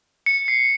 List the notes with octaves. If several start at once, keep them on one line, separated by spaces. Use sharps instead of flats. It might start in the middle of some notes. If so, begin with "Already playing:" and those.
C#7
C7